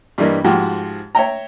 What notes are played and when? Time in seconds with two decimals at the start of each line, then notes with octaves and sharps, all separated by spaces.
0.18 G2 E3 G3 A#3 D#5
0.44 G#2 F3 F#4 G4 G5
1.15 C#5 E5 G5 A#5